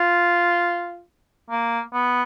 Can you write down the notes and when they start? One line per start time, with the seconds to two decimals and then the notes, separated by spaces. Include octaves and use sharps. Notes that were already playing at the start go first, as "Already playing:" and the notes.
Already playing: F4
1.51 A#3
1.93 B3